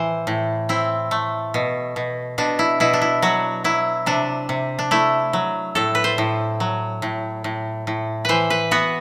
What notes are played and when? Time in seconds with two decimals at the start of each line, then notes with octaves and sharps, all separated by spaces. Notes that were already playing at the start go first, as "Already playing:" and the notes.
Already playing: A2 E3 C5
0.27 A2
0.69 C4 E4
1.11 A3
1.54 B2
1.96 B2
2.38 B2 D4
2.59 E4
2.80 B2 E4
2.93 D4
3.02 E4
3.22 F#3 F#4
3.64 F#3 E4
4.06 C3 D4
4.49 C3
4.79 D4
4.91 A3 E4
5.33 F#3
5.75 A2 A4
5.95 B4
6.04 C5
6.18 A2
6.60 F#3
7.02 A2
7.44 A2
7.87 A2
8.25 E3 B4 C5
8.50 B4
8.71 B3 F#4